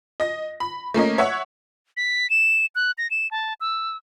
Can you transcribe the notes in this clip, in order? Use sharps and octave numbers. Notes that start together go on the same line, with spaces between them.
D#5 A#6
B5
A3 A#3 C#4 D#5
C#5 E5 F#5 C#6
B6
E7
F#6
A#6
E7
A5
E6